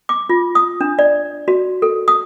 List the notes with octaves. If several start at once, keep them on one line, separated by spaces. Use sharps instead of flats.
D6
F4
D#6
D4
D5
F#4
A4
D#6